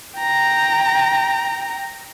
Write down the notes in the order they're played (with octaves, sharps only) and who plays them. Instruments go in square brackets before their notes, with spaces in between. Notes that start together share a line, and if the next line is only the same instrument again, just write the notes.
[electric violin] G5 A#5